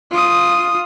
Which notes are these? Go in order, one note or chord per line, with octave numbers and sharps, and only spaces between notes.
F4 D#6